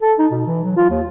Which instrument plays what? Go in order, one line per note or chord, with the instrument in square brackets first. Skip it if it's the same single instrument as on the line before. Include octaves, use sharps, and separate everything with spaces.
[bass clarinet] A4
D#4
B2
E3
F#3
F4
D#2